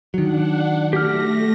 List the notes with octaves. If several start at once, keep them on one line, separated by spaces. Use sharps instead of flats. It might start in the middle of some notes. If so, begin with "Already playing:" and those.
D#3 F#3 D4 F#5
A3 G4 F6 A#6